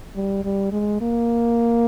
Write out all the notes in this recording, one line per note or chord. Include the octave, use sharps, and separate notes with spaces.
G3
G3
G#3
A#3